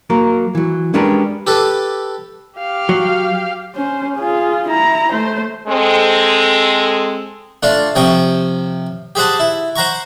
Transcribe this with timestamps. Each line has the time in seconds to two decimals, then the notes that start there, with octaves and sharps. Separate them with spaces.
0.10 F#3 A#3 A#4
0.55 E3 F#3
0.94 G#3 C#4 D4 G4 A#4 B4
1.47 G4 A4 B4
2.59 G4 F5
2.89 F#3
3.75 C#4 C5
4.16 F4 G#4
4.68 E4 A#5
5.12 A3 C5
5.68 G#3 C4 A4
7.63 A3 D4 F4
7.95 C3 F3 C#5 G5 D#6
9.15 G4 G#4 C5 F#5 A5
9.39 E4
9.76 C5 F#5 A#5 C#6